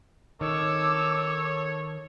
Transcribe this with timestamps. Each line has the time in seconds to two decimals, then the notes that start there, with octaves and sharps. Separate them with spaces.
0.41 D#3 A4 C#5 D6 E6